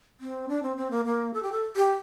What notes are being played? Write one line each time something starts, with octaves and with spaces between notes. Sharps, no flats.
C4
D4
C4
C4
A#3
A#3
A4
G4
A4
G4